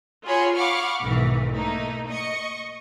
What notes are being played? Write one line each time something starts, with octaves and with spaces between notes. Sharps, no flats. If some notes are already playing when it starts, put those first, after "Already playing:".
F4 F#4 G#4 C#5 B5 C6
F5 F#5 B5 C#6 D6 F6
B1 G#2 D#3 E3
A3 A#3 D#4
D#5 C#6